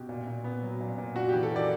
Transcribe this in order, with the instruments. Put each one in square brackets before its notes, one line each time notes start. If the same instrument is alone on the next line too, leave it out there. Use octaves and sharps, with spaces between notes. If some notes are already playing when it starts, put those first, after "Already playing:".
Already playing: [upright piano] B2 G4
A#2
A#2
B3
F#3
A#2
A#2
D4 F#4
G4
E3
A4
A#3 D5